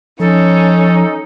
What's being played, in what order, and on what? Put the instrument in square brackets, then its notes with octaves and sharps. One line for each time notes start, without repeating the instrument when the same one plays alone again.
[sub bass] F3 [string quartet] C#4 [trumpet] D#4 [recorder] A4